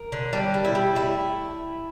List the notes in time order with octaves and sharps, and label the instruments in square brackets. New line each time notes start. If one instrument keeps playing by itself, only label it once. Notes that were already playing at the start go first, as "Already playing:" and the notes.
Already playing: [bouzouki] A#4
D3
G3 D4
G3
E4
G3
A3 E4